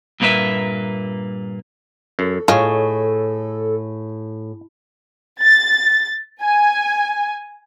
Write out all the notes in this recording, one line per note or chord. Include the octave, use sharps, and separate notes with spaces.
G2 A#2 A#3 D4 B4 E5
F#2 A4
A2 F4 G#4 C#5 D#5
A6
G#5